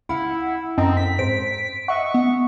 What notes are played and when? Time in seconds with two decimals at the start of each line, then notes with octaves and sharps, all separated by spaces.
0.09 C#2 E4 F5 F#5
0.78 F#2 C4 A4 D#5 A#5
0.97 B6
1.19 G#2 C5 D7
1.88 D#5 E5 F#5 C#6
2.14 B3